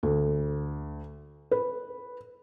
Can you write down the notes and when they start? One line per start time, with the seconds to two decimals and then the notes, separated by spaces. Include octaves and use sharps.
0.03 D2
1.51 B4